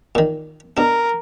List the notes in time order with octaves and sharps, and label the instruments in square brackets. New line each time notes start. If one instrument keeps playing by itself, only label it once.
[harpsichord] A#2 D#3
[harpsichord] B2 D4 [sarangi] A#4